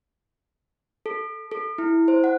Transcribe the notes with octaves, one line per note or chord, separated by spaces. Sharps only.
A4
A4
E4
C5
F#5